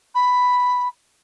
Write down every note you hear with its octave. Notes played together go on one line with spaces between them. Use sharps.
B5